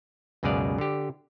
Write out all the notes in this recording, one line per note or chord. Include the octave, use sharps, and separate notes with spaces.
C#2 F#2 B2 G#4 D5 F5
D3 G4